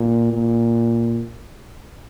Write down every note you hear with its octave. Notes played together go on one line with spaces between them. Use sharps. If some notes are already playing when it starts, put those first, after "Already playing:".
Already playing: A#2
A#2